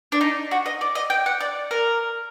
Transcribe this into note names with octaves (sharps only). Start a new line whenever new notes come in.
D4
D#4
F#4
D#5
D5
D#5
G5
F#5
D5
A#4